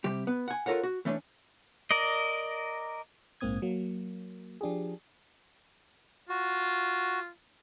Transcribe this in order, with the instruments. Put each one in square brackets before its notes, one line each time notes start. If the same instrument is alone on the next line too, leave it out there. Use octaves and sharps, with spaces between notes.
[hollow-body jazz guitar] C3 G3 G4
B3
F#5 G#5
F4 A4 A#4 C#5 F#5
F#4
E3 A3 C#4 D4
[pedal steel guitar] A#4 D5 D#5
[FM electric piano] A#1 G#2 A#3 C4 D#6 G#6
F#3 A#3
F3 D4 G4 G#4
[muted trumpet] F4 [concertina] F#4